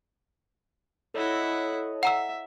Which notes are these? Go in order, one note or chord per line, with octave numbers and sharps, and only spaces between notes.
E4 A4 C#5 D#5 F#5
E5 F#5 A#5 E6